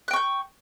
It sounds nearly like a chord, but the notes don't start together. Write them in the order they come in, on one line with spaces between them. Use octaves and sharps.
F#6 G5 C#6 G6